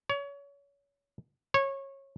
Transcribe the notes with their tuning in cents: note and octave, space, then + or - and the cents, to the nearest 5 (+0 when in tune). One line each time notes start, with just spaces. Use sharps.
C#5 +30
C#5 -20